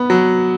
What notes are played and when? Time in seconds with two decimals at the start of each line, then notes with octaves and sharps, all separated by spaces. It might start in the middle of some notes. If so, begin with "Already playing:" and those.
Already playing: B3
0.10 F#3